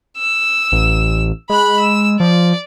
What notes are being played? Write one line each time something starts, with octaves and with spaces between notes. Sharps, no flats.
E6
A1
G#3 B5 F#6
E6
F3 D5